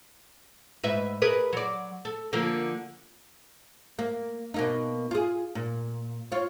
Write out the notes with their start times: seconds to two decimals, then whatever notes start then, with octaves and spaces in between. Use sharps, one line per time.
0.83 G#2 B4 E5
1.22 G#4 A#4 B4
1.53 F#3 D5
2.05 A4
2.33 D3 F3 A#3
3.99 A#3
4.54 B2 A#3 D#4
5.11 F4 G#4
5.55 A#2
6.32 F4 C#5